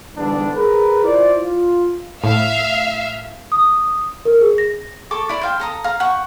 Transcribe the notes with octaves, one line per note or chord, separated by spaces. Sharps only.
E2 G#2 D3 G3 B3 D4
G#4 A#4 B4
E4 F4 C5 D5
F4
A2 E5 F5
D#6
A#4
G#4
A#6
A4 C#6 D6
E4 D5
C5 F5 G5
A4 A#5 D#6
F5 A#5
F#5 G5 C#6